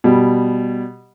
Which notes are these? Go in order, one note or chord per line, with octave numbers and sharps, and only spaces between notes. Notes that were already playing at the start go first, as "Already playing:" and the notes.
B2 G3